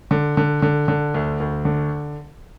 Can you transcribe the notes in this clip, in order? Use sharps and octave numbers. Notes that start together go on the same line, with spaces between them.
D3
D3
D3
D3
D2
D2
D3